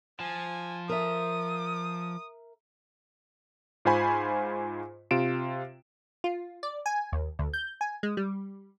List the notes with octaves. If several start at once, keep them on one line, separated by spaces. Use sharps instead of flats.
F3 G#5
A#4 E5 D#6
G#2 F4 C5 G#5 B5 C#6
C3 F4 D7 E7
F4
D5
G#5
D#2
D2
G6
G#5
G#3
G3